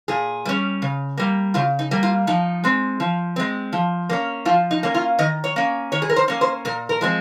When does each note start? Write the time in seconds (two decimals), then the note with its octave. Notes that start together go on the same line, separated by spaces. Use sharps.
0.08 A#2 G#4
0.45 G3 C#4
0.82 C#3
1.17 G3 A#3
1.54 C#3 F4
1.79 D#4
1.91 G3 A#3
2.03 F4
2.27 F3 D#4
2.64 G#3 C4
3.00 F3
3.36 G#3 C4
3.73 F3
4.09 A#3 C#4
4.45 F3 F4
4.71 D#4
4.83 A#3 C#4
4.94 F4
5.19 D#3 D#5
5.44 C#5
5.56 A#3 C#4
5.92 D#3 C#5
6.02 G#4
6.09 A#4
6.16 C5
6.28 A#3 C#4
6.41 C5
6.65 A#2 A#4
6.89 A#4
7.01 F3 G#3 C4